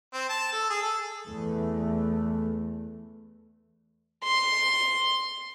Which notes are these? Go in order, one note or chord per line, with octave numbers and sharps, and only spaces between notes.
C4
A5
A4
G#4
A4
E2 A3
C6